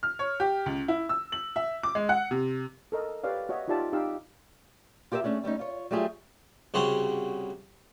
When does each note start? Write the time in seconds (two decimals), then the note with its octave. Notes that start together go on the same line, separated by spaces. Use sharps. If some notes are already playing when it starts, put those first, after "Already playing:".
0.03 F6
0.19 C#5
0.40 G4
0.66 C#2
0.88 E4
1.09 E6
1.32 F#7
1.56 E5
1.83 D6
1.95 G#3
2.09 F#5
2.31 C3
2.92 A4 A#4 D#5
3.24 G4 B4 C#5 D5 F5
3.49 F#4 C#5 D#5 E5
3.68 D#4 F4 G4 D5 E5 A5
3.93 D#4 G4 F5 E6
5.12 F4 G4 A#4 D#5 E5
5.24 A3 C#4 D4 G#4
5.43 G3 A3 C#4 D#4
5.59 F4 C#5
5.91 F#3 G3 A3 F4 G4 G#4
6.74 C2 C#3 G3 F#4 C6